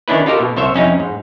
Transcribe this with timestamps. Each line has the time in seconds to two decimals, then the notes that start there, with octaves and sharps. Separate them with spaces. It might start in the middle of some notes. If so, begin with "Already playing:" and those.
0.08 D#3 C#4 D4 E4 B4
0.26 D#4 F4 G4 A4 A#4
0.40 B2
0.57 C2 C5 C#5 E5
0.74 F2 C#4 D#4 E4
1.00 G#2